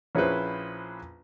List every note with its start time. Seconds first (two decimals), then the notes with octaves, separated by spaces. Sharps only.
0.15 A#1 C#4 E4 G#4 B4 C5